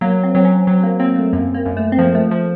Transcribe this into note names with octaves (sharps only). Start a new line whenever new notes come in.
F#3 A#3
C4
F#3 C4
C#4
F#3 C4
A#3
A#3 C4
A3
F#2 A#3
A#3
F#2
A3
C4
F3 A#3
A3
F3